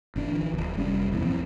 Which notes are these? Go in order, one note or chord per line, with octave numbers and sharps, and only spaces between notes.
A1 D4
D#3 F3
D1 C2
F1 G3 C#4
A#1 E2 B2 E3
A2 F3 C4